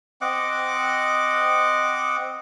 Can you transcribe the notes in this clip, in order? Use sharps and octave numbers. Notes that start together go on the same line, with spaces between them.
C4 D#5 F#5 D6